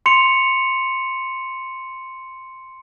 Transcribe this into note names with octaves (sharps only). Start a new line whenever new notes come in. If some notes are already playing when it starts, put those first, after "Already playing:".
C6 C#7 F7